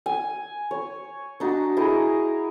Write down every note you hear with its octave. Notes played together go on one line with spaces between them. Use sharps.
G#5
C#5
D4 D#4 F#4
D#4 E4 G#4 A#4